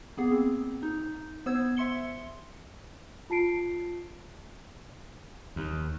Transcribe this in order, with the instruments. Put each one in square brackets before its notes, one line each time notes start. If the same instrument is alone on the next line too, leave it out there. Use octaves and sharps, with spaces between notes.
[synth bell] A#3 B3 G#4
C4
D#4
B3 C5 E6 G#6
E5 C6 C#7 G7
[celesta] F4 A5 C7 D7
[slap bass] D#2